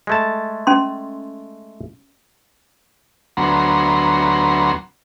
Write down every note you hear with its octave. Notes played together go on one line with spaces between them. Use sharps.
G#3 A3 A5
C#4 C6
D2 F#3 B3 A#5 C6